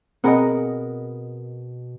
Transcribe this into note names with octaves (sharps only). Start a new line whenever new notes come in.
B2 B3 C4 G#4 A#4 D#5 F#5